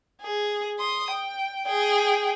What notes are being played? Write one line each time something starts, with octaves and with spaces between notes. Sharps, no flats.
G#4
C6 D#6
G5
G#4 G5